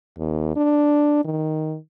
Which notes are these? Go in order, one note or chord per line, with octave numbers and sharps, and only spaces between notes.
D#2
D4
D#3